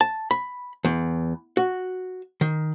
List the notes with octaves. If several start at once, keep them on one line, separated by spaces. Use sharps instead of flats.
A5
B5
E2
F#4
D#3